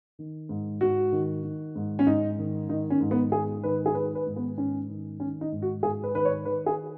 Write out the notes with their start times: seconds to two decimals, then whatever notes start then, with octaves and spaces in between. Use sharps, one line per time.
0.19 D#3
0.49 G#2
0.81 G#2 F#4
1.12 D#3
1.43 D#3
1.76 G#2
1.99 C#4
2.07 G#2 D#4
2.39 D#3
2.69 D#3 D#4
2.90 C#4
3.01 G#2
3.11 B3
3.32 G#2 G#4
3.63 D#3 B4
3.86 G#4
3.95 D#3 B4
4.15 B4
4.27 G#2
4.36 B3
4.57 G#2 C#4
4.89 D#3
5.20 D#3 C#4
5.41 D#4
5.52 G#2
5.62 F#4
5.83 G#2 G#4
6.03 B4
6.14 D#3 B4
6.25 C#5
6.45 D#3 B4
6.66 G#4